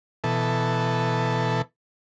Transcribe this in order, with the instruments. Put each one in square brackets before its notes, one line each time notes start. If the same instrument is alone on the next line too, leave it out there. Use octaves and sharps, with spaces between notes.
[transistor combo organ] B2 E3 A4